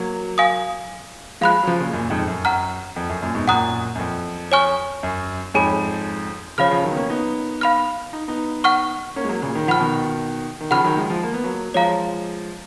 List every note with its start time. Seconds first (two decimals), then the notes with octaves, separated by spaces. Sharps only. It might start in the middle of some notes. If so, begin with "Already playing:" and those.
Already playing: F#3 A#3
0.38 F5 G#5 D#6
1.41 F3 G#3 F5 B5 F#6
1.62 F#3
1.67 C#3 F3
1.80 A#2 C#3
1.93 F#2 A#2
2.10 F2 G#2
2.28 F#2
2.45 F#5 A#5 F6
2.96 F2
3.09 F#2
3.22 F#2 A#2
3.35 G#2 B2
3.48 F#2 A#2 F#5 A#5 D#6 F#6
3.95 F#2
3.99 F2
4.52 C#5 G#5 C#6 F6
5.03 F#2
5.54 F2 G#2 G#4 C#5 G#5 B5
6.58 C#3 F3 C#5 F5 B5 F6
6.71 C#3 F3
6.83 D#3 F#3
6.91 B3
6.97 A#3 C#4
7.10 B3 D#4
7.61 F5 B5 F6
8.13 D#4
8.28 B3 D#4
8.64 F#5 C#6 F6
9.16 A#3 C#4
9.24 G#3
9.29 F#3 A#3
9.42 A#2 C#3
9.55 D#3
9.67 F3 F#5 B5 F6
9.80 B2 D#3
10.60 D#3
10.71 C#3 F3 F#5 B5 F6
10.84 D#3 F#3
10.97 F3 G#3
11.10 F3 G#3
11.23 A#3
11.34 B3
11.44 F#3 A#3
11.74 F3 G#3 C#5 F5 A#5